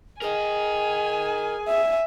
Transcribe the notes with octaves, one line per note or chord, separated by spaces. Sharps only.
G#4 A#4 D#5 G#5
E5